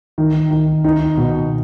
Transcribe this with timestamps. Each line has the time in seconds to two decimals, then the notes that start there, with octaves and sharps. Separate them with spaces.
0.18 D#3
0.51 D#3
0.84 D#4
1.17 B2